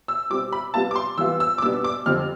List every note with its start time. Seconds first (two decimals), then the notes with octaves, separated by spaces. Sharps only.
0.08 E6
0.30 B2 G3 C4 D6
0.52 B5
0.74 C3 G3 B3 F4 A5
0.91 D6
0.95 C6
1.18 E3 G3 B3 F4 E6
1.40 E6
1.58 D6
1.62 B2 G3 B3 D4 E6
1.84 D6
2.06 F2 D3 G3 C4 F6